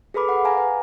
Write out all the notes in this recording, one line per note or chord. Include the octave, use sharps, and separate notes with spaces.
G#4 A4 B4 B5 D6
F#5
F5 G#5 A#5
B4